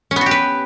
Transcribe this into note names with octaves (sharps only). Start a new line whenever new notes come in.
C#4
B3
F#4
G4
B4